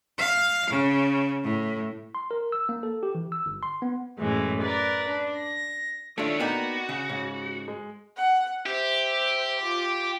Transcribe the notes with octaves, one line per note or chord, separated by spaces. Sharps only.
F5
C#3
A2
C6
A#4
E6
A#3
A4
G4
E3
E6
G1
C6
B3
F#2 A2 E3 G#3
A#4 B4 D5
D4
A#6
D#3 A3 D4 E4 F4 A4 C#5
A#3 B3 D#4 F#4 D5 G5 A#5
C#3
G#2 C#3
G#3
F#5
G4 C5 E5
F4 D6